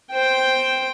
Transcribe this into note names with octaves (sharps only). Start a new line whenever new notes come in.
C5 G5